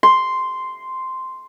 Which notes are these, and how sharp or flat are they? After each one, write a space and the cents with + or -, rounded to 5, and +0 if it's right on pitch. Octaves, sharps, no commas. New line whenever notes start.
C6 -5